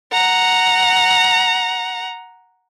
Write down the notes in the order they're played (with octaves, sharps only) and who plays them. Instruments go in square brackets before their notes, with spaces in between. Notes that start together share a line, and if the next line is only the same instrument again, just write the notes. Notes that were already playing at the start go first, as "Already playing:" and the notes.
[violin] F#5 A#5